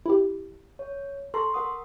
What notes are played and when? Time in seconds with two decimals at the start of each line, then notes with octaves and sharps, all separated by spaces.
0.06 E4 G4
0.79 C#5
1.34 A4 A5 A#5 C6 C#6
1.54 A#4 F#5 D#6